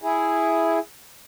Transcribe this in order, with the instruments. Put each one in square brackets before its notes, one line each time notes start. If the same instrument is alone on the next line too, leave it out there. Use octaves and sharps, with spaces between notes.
[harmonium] E4 G#4